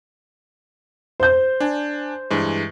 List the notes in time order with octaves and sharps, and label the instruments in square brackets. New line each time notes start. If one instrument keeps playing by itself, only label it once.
[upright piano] C5 G6
[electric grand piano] D4 G#5
G2 E3 G#3